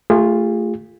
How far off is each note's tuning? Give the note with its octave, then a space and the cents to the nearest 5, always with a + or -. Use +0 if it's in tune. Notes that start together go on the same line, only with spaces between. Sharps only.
A3 +10 F4 +0 G#4 -40